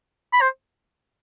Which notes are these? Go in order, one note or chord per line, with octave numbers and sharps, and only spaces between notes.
B5
C5